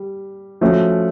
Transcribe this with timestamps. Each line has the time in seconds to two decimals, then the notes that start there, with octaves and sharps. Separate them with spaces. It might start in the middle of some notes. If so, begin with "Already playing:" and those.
Already playing: G3
0.61 F3 A3 C#4 F#4